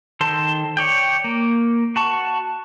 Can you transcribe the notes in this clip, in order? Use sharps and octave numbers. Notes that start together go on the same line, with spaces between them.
D#3 A4 C5 A5 C6
C#5 D5 G5
A#3
F#4 A5 C#6